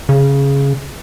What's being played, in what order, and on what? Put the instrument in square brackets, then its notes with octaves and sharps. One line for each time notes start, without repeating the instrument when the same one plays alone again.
[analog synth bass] C#3